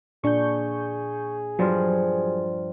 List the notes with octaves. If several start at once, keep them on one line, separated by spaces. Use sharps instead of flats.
A#2 D4 G#4 C#6 G6
G2 F3 F#3